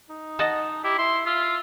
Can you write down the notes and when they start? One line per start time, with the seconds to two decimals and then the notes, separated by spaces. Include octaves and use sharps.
0.09 D#4
0.39 D#5 F#5 A5
0.84 E4 G4
0.98 E4 C6
1.26 F4 E5